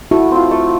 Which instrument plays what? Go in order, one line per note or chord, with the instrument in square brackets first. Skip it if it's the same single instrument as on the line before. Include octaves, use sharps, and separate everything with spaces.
[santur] A3 [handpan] E4 F#4
[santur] C4 F4
A3